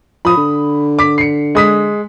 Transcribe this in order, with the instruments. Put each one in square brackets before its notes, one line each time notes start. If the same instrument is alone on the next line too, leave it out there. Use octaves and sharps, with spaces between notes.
[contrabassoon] F3 [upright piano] B5 D#6
[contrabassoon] D3
[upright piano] D6 B6
C7 C#7
G#3 D#6 B6